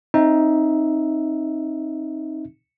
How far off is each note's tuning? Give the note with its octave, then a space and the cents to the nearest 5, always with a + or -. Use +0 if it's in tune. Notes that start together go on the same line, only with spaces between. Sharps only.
C4 +35 D#4 +10 E5 +0